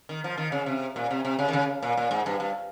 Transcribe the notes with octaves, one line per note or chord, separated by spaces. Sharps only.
D#3
F3
D#3
C#3
C3
A#2
C3
C3
C#3
D#3
C#3
A#2
A#2
G#2
G2
G2